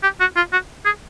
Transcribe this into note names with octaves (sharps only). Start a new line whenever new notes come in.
G4
F#4
F4
F#4
G#4